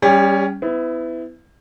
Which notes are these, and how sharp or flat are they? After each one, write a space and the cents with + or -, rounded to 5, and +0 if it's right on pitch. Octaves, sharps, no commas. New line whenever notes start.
G3 +0 C#4 +10 G4 +45
B3 +35 E4 +0